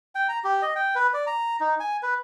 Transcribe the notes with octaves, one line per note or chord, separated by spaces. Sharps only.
G5
A#5
G4
D#5
G5
B4
D5
A#5
D#4
G#5
B4